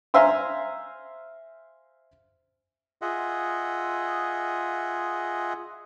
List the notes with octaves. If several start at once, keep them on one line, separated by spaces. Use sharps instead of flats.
C5 E5 F5 G#5 A#5 C6
F4 G#4 D#5 E5 F#5